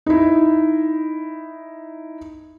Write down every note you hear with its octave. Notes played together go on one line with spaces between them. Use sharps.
D#4 E4